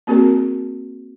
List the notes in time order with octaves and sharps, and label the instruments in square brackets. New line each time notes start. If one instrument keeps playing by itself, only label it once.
[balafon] A#3 C4 F#4 G#4 A#4